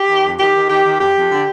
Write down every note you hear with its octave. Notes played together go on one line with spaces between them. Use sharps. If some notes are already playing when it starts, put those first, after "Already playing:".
Already playing: G4
D#3
F2
D#3 G4
D#3
D#3 G4
D#3
F2 G4
F2
D3